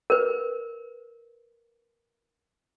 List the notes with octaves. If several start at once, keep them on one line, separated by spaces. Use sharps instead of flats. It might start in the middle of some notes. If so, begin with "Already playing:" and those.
A#4 B4